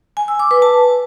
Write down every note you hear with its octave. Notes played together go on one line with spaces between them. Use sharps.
G#5
E6
D6
B4
A5